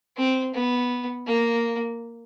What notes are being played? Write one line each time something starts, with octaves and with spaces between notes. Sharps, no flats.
C4
B3
A#3